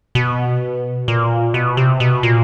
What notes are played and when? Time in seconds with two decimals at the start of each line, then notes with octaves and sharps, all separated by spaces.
0.15 B2
1.08 A#2
1.54 B2
1.77 C3
2.00 B2
2.23 A#2